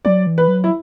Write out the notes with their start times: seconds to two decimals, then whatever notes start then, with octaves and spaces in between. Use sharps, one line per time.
0.05 F#3 D5
0.27 E3
0.38 B4
0.48 F#3
0.64 E4